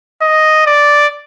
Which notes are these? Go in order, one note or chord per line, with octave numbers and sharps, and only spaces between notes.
D#5
D5